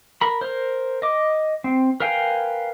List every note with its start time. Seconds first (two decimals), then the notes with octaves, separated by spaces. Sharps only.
0.21 A#4 B5
0.41 A#4 C5
1.02 D#5 D6
1.64 C4
2.00 A#4 B4 F5 G5 G#5